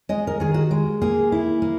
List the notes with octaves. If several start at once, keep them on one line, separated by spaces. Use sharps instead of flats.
G#3 D#5
A#4
D#3 G#4
F#4
G#3
A#3 G#4
E4
A#3